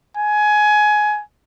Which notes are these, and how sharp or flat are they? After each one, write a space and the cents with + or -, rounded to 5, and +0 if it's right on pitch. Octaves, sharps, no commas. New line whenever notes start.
G#5 +20